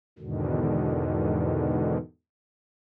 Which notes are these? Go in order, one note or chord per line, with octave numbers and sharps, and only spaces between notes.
E2 G#2 B2 D3 D#3